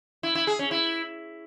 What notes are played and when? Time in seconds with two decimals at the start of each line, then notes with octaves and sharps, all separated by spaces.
0.23 E4
0.35 E4
0.47 G#4
0.59 C#4
0.71 E4